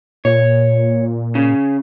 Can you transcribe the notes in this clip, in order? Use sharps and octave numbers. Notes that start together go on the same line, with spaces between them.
A#2 C#5
C#3